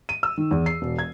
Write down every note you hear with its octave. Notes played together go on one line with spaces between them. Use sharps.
D#7
E6
D#3
E2
C7
E1
G#6